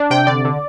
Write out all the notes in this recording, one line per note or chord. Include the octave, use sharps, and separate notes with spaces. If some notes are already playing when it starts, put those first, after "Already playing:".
Already playing: D4
C3 G5
D3 D5
D3